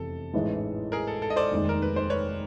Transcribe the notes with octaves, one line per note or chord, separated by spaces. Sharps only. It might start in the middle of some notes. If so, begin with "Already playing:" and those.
Already playing: F1 E2 C3 A4
A1 G#2 E3 G#3
G#4 A#4
A4
A4
D#5
C5 D5
F1 D#2 D#3 G#3
A#4
B4
C5
B4 C#5